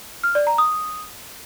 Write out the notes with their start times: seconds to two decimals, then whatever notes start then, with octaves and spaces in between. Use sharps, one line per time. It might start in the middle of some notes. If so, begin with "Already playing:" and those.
0.24 F6
0.35 D5
0.47 A#5
0.58 D#6